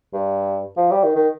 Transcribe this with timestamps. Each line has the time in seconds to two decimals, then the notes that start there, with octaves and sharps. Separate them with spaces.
0.13 G2
0.77 F3
0.91 G3
1.04 D#3
1.16 D#3